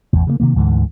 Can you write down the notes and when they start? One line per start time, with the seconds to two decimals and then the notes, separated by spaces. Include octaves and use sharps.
0.13 A1 E2 A#2
0.27 C#3 G3 A#3
0.40 C3 D#3 A#3
0.55 D2 G#2 D3 E3